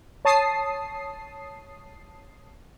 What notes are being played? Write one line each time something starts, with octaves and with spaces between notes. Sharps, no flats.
C#5 A5 D#6 C7